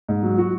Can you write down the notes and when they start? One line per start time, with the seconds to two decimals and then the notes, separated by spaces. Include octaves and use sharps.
0.09 G#2
0.23 F#3
0.38 F#4